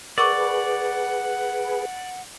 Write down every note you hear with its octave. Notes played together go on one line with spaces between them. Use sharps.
G#4 A#4 B4 D5 F#5 C#6 D6